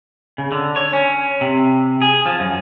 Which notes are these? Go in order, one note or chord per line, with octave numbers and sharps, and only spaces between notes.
C#3
D3
C#5
C#4
C3
G#4
F3
F#2